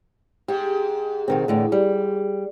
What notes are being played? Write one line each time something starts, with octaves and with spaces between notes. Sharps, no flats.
G#2 G4
B2 D#3 C4
E2 A2 D3
G3